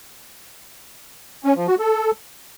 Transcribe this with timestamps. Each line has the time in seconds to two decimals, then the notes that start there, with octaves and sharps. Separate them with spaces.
1.44 C#4
1.56 F3
1.67 F#4
1.79 A4